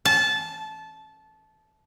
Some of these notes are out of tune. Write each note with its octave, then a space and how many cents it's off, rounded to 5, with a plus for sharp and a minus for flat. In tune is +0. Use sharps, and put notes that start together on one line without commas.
A5 -20